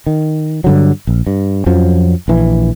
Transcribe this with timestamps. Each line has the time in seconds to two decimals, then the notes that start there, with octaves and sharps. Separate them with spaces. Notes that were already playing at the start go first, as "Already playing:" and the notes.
0.06 D#3
0.64 G2 D3 F#3
1.07 A#1
1.27 G2
1.66 F2 F3 F#3 C#4
2.28 A#1 E3